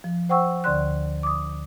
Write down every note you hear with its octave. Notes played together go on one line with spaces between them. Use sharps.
F3
C5 F#5 G5 C#6 E6
D2 D3 D5 C6 F#6
D6 D#6